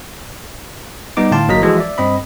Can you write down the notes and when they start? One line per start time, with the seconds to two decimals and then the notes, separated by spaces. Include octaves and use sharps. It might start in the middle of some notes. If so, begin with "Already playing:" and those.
1.17 G3 B3 D#4 D6
1.31 A2 D3 F5 G5 A5 C6
1.48 G1 F#3 A#3 D#5 A#5 B6
1.62 E3 F3 G#3 F#4 A4
1.77 D5 E5
1.98 G2 C4 D#5 B5